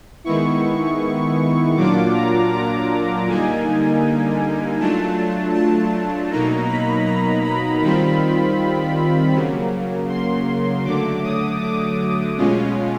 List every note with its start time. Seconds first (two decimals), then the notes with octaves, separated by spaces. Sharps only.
0.24 D#3 G#3 B3 E4 C#6
1.76 A#2 F#3 A#3 D4 F4 D6
2.14 A#5
2.52 A#5
3.27 D3 G3 A#3 D#4 G#5
4.79 F#3 A3 D4 F4 A5
5.54 A5
6.31 B2 F#3 A#3 D#4 A#5
6.68 B5
7.06 A#5
7.44 B5
7.82 D#3 G3 C4 F4 B5
9.34 C#3 F#3 A#3
10.09 C6
10.85 D3 F#3 A3 D6
11.23 D#6
11.61 D6
12.37 B2 G#3 C#4 F4